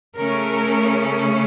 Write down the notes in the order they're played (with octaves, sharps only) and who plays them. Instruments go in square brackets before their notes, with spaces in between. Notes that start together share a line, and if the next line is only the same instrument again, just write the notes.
[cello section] C#3 A3 C#4 A#4